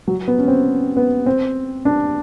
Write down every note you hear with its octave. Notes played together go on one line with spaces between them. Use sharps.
F#3
B3
C#4
C4
B3
C4
D4